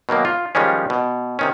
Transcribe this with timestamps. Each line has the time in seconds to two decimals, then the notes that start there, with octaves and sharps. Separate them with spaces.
0.09 B2 D#3 F#3 A#3
0.25 F4
0.55 D#3 F3 G3 G#3 C#4
0.90 B2
1.39 C3 D#3 C#4